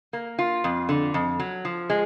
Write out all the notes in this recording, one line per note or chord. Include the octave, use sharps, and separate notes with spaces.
A#3
F4
F2
D3
F2
F#3
F3
G#3